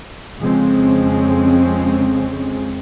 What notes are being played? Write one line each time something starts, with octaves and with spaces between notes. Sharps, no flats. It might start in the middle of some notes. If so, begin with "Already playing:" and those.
F2 C#3 F3 G#3 C4 C#4